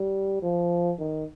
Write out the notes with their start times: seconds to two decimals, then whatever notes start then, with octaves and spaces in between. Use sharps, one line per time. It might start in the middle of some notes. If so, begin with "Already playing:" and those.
Already playing: G3
0.42 F3
0.99 D#3